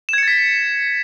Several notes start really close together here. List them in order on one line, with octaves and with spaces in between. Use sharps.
E7 G#6 C#7 A6 B6